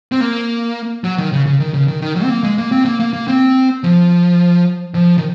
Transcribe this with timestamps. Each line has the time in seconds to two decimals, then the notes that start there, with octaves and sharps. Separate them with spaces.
0.12 C4
0.20 A#3
1.04 F#3
1.18 D#3
1.32 C#3
1.46 C#3
1.60 D#3
1.74 C#3
1.88 D#3
2.02 D#3
2.16 F#3
2.24 C4
2.30 A#3
2.44 G#3
2.58 A#3
2.72 C4
2.86 A#3
3.00 A#3
3.13 A#3
3.28 C4
3.84 F3
4.94 F3
5.18 D#3